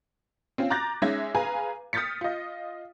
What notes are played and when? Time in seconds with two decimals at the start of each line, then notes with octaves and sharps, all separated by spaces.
0.58 C4 C#4 F4
0.70 A#5 D6 F#6 G6 A6 A#6
1.02 G#3 C#4 D#4 E5 G#6 A#6
1.35 G#4 B4 F5 G#5 A#5
1.93 D#6 F6 G6 A6 B6 C#7
2.21 F4 D#5